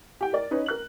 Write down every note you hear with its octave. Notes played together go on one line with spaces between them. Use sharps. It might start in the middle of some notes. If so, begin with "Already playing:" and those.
G4 G5
A#4 D5
C#4 D#4 B4
A#4 F#6 F#7